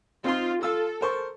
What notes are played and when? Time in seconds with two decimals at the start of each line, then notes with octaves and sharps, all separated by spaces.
0.24 C4 D#4 F4 C6
0.63 F4 A4 E6
1.01 A#4 C5 C#6